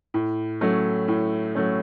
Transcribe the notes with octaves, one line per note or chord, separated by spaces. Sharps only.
A2
F#3 A3 C#4
A2
F#3 A3 C#4